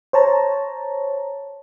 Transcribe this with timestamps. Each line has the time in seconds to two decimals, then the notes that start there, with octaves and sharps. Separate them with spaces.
0.13 C5 C#5 A5 A#5